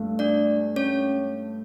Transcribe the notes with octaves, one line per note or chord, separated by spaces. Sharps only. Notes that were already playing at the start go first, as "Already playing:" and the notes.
Already playing: G2 A3
D4 D5
C#4 C#5